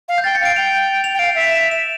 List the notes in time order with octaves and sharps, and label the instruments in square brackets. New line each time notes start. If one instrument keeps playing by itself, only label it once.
[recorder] F5
[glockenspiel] G6
[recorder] G5 [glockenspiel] A6
[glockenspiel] C#7
[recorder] F5 [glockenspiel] D7
[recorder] G5 [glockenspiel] F7
[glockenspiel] F7
[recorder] G5
[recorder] F5 [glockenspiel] D7
[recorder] E5
[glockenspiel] F7
E7
F7
E7